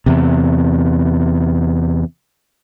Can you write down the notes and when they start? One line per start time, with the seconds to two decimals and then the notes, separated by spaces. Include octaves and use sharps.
0.06 E2 C3